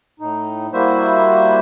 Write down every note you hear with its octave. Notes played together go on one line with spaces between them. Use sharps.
A2 D#4
G3 A#3 E4 F#4 C5 E5